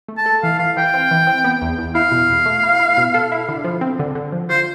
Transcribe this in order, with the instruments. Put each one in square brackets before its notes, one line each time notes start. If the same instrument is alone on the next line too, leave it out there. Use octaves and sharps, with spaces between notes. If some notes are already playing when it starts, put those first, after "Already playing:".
[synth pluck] A3
[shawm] A5
[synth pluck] A4
[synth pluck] E3 [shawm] F5
[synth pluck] E3 [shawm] F5
[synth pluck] E3 [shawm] G5
[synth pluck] C4
E3
C4
B3
E2
E2
[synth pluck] E4 [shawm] F5
[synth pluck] B2
E2
A3
E4
E4
B2
A4
E4
D3
F3
C4
D3
D3
F3
[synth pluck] F4 [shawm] C5